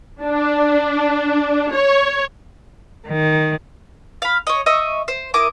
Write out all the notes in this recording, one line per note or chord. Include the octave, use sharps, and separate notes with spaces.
D4
C#5
D#3
F5 B5
C#5 D#5
D#5 E5 C#6
C5
E4 A#4 D6 D#6